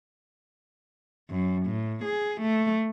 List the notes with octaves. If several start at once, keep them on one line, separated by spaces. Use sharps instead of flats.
F#2
A2
G#4
A3